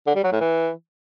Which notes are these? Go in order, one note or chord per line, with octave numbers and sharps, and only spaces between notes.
D3
G3
F#3
A2
E3